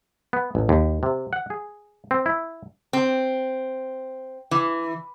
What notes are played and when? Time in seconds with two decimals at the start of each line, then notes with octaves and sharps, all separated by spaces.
0.33 B3
0.55 A1
0.69 D#2
1.03 C3
1.33 F#5
1.50 G#4
2.11 C4
2.26 E4
2.93 C4
4.51 E3